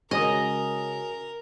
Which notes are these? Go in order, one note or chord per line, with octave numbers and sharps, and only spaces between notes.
C#3 G#3 C#4 F#4 A#4 D#5 G#5 D#6